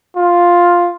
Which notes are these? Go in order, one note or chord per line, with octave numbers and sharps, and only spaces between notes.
F4